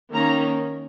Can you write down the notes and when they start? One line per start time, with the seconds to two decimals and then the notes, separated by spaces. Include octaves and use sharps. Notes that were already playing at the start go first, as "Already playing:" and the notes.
0.13 D#3 A#3 C#4 A#5